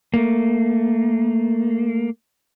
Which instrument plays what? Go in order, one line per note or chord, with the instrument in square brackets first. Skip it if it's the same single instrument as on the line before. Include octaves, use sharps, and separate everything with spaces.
[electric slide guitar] A3 A#3